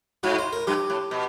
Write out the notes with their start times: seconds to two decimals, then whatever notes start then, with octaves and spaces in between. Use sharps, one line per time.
0.23 G#2 F#4
0.39 C5
0.53 A#4
0.67 G2 G4
0.90 A2
1.11 B2